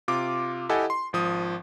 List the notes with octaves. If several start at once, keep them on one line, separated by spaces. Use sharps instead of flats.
C3 F4 D6
E4 G4 A4 D#5 F#5 G#5
C6
G#1 F3 D#6